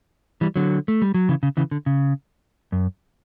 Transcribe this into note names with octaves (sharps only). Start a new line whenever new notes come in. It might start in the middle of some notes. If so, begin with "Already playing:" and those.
E3 G3
D3 F#3
A3
G3
F#3
C#3 E3
C#3
C#3 E3
D3
C#3
F#2